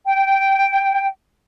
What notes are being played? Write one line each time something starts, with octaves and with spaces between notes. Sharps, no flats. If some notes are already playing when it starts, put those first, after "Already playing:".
G5